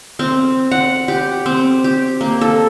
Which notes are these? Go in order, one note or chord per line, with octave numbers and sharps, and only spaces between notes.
C4
F#5
G4
C4
G4
A#3
A4